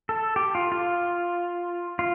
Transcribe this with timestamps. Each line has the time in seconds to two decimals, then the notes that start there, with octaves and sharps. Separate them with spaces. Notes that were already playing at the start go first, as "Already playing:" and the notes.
0.09 A4
0.36 G4
0.55 F4
0.72 F4
1.99 F4